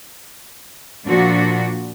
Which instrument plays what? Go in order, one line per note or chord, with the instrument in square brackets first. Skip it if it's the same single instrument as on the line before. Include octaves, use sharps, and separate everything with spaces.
[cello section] A#2 F3 D4 F#4